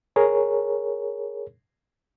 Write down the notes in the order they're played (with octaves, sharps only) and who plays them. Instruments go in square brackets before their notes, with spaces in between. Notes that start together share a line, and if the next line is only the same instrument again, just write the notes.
[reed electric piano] G#4 A#4 C#5